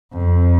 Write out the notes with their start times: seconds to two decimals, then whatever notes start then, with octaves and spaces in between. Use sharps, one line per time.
0.13 F2